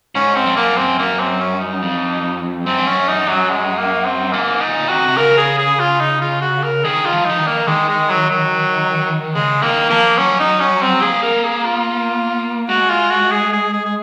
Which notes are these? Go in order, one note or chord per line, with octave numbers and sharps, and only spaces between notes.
G#2 C#4
C4
F2
F#2 A#3
C4
F#2 A#3
C4
C#4
D#4
F2
F#2 C4
G#2
F#2 C#4
D#4
F#3
G#3
A#3
C4
G#2 A#3
A#2 D#4
C3 F#4
C3
C#3 A#4
G#4
G#4
F4
D#4
F4
F#4
A#4
D#3 G#4
F4
F3
F3 D#4
D#3
A#3
D#3 G#3
G#3
F#3
F#3
C#3 G#3
D#3 A#3
F3 A#3
F#3 C#4
D#4
C#4
C4
A#3 G#4
A#4
G#4
F4
G#3 F#4
F4
F#4
G#4
G#4
G#4
G#4